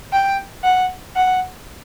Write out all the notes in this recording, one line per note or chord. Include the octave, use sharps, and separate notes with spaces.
G5
F#5
F#5